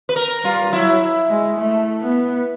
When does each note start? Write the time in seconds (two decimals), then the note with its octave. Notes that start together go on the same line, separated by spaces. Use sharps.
0.09 B4
0.16 A#4
0.44 G3 F4
0.73 F#3 E4
1.30 G#3
1.58 A3
2.01 B3